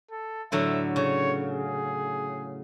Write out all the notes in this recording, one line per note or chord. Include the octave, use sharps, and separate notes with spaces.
A4
A2 D3 F#3 E5
C#3 C#5
G#4